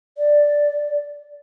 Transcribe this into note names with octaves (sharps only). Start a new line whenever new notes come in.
D5